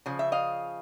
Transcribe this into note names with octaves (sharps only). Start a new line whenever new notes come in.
C#3 F3
E5
D#5 F5